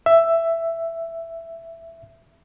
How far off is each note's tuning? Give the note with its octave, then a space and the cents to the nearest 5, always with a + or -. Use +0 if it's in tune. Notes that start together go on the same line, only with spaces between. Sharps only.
E5 +10